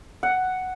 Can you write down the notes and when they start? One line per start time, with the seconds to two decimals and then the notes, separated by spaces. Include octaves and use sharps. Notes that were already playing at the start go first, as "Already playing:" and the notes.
0.23 F#5